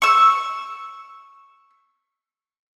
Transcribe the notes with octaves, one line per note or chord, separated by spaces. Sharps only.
C#6 E6